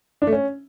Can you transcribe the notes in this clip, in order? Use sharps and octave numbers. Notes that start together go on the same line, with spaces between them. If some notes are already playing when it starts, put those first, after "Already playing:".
D4
A3
C#4